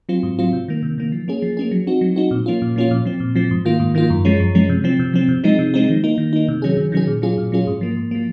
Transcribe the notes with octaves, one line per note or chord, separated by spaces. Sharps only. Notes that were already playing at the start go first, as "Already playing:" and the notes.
F#3 C4 F4
G#2
F#3 C4 F4
C3
D#3 A#3
C3
D#3 A#3
F3
A#3 C#4 G#4
F3
A#3 C#4 G#4
F#3
C4 D#4 F#4
F#3
C4 D#4 F#4
A#2
F3 A#3 C#4 F4
A#2
F3 A#3 C#4 F4
A#2
F3 C4
A#2
F3 C4
G#2
D#3 A#3 F4
G#2
D#3 A#3 F4
F#2
F3 G#3 C#4
F#2
F3 G#3 C#4
C3
F3 C4
C3
F3 C4
C3
F3 G#3 C4 D#4
C3
F3 G#3 C4 D#4
D#3
A#3 D#4
D#3
A#3 D#4
C3
D#3 F#3 C#4 G#4
C3
D#3 F#3 C#4 G#4
A#2
F#3 C#4 F4 G#4
A#2
F#3 C#4 F4 G#4
G#2
F3 A#3
G#2
F3 A#3